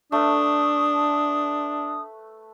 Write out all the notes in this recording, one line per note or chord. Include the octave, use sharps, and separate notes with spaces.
A3 D4 B4 D#6